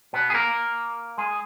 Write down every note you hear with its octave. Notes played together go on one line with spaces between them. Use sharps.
B2 B3
G#4
A#3 A#4
G#3 G#4